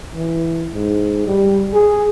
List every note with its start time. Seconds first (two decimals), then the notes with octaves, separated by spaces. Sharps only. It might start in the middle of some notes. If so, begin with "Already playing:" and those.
0.14 E3
0.74 G#2
1.27 G3
1.74 G#4